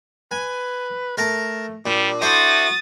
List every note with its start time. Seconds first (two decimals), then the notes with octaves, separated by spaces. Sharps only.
0.31 B4 G#5
1.17 A3 A#4 A5 A#5
1.86 A#2 G3 D4
2.22 E4 F#4 A4 C5 D#6 A6